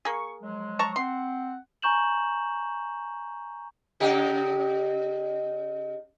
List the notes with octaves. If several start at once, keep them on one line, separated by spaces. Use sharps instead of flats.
A#3 G#4 C#6
F3 F#3 G#3
A5 A#5 C#6
C4 F#5 C6
G#5 A#5 C#6 G6 E7 F#7
C#3 D#4 G4